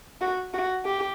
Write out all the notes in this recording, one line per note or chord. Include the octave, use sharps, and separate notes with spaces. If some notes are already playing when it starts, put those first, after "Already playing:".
F#4
F#4
G4